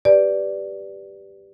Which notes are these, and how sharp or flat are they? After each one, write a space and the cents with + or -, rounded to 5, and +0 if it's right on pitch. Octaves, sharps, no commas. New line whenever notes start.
G4 +0 B4 +0 D5 +0